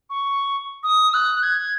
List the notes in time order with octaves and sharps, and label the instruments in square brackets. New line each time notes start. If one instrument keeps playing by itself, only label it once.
[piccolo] C#6
D#6
F#6
G#6